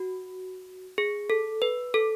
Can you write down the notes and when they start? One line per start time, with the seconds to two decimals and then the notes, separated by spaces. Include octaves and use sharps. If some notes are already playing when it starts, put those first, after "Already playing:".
Already playing: F#4
0.98 G#4
1.30 A4
1.62 B4
1.94 A4